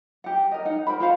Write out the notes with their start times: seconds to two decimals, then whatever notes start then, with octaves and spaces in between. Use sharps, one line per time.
0.24 G4 F#5
0.51 A#4 D#5
0.65 D#4 F#5
0.87 A#4 C5 B5
1.00 F4 C5 F5 F#5